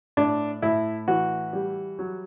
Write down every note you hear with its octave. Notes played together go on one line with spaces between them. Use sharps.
A2 D4
A2 E4
E3 F#4
G3
F#3